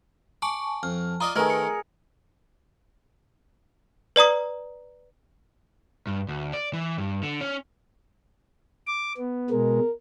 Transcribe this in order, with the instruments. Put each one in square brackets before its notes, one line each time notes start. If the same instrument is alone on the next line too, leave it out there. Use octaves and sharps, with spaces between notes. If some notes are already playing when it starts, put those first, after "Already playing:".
[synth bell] G#5 A5 C#6 [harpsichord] D6
[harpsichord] F2 [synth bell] F6
[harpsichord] F4 D5 D#5 [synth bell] A#5 D#6
[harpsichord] D#3 A3 [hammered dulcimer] G#4 A#4 [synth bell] B4 D#5
[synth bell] C#7
[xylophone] B4 D5 A#5 D#6
[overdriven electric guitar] G2
D2
D5
E3
G2
D3
C#4
[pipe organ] D6
B3
[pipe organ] B2 G#3 [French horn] A#4